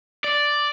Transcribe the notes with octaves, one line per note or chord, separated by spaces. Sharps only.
D5